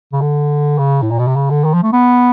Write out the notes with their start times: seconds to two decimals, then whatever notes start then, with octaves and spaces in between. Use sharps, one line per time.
0.13 C#3
0.21 D3
0.78 C#3
1.02 A2
1.11 A#2
1.19 B2
1.27 C3
1.36 C#3
1.50 D3
1.64 D#3
1.74 F3
1.84 A3
1.93 B3